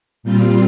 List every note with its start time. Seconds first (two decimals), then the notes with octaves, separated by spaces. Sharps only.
0.23 A#2 G3 C4 F4